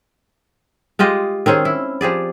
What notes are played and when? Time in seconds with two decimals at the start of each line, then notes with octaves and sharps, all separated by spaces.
0.99 G#3 F4 G4 D#5
1.46 D#3 C4 C#4 G#4
1.65 E4
2.01 F3 G4 G#4 D5